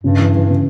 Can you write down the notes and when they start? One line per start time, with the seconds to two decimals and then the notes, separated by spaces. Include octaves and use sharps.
0.03 G2 C#3
0.19 E3
0.34 E3
0.49 C#3